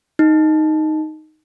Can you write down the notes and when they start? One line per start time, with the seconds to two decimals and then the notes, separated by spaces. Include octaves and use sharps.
0.19 D#4